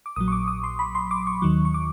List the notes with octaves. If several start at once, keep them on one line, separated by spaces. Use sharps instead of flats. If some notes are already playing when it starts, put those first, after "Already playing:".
D6
A#1 A#2 F#3 D#6
C#6
D6
D#6
C6
B5
C6
D6
C#6
D#2 D#3 F#3
C#6
D6